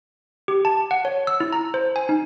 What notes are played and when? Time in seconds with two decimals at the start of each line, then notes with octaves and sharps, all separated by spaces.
0.48 G4
0.65 A5
0.91 F#5
1.05 C#5
1.27 E6
1.40 E4
1.53 A#5
1.74 C5
1.96 G#5
2.09 D#4